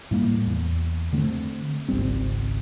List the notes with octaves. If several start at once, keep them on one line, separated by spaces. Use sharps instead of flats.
A2 G3 A#3
E2
D3 A3 B3 C4
G#1 C#2 G3 C4